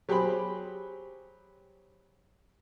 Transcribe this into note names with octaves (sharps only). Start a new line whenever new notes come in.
F#3 G4 G#4 C5 B5